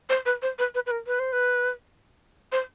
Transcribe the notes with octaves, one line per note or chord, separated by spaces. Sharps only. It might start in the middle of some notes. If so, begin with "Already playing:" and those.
C5
B4
C5
B4
B4
B4
A#4
B4
C5
B4
C5